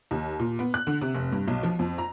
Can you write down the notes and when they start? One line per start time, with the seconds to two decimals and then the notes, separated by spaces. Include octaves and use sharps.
0.11 D#2
0.39 A#2
0.59 B3
0.74 F#6
0.87 D3
1.02 C3
1.15 F1
1.32 G2
1.48 B1
1.63 F3
1.79 F2
1.98 A#5